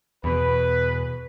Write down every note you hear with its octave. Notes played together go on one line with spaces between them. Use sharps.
E2 B2 B4